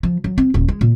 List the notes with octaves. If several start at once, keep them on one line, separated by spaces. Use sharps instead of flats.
F3
F#3
C4
D#1
G#3
A#2